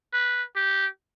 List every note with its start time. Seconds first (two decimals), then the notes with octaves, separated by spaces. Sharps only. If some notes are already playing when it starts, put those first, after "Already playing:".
0.13 B4
0.56 G4